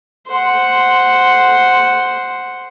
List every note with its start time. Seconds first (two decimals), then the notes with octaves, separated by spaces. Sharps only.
0.28 C5 F#5